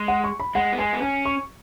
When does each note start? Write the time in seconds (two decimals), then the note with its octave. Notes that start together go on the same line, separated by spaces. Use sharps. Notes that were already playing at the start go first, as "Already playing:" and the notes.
Already playing: G#3
0.08 F#5
0.24 C#6
0.40 B5
0.55 G#3 F#5
0.72 B3
0.78 G#3 G#5
0.93 B3
1.02 C#4 G#5
1.25 C#6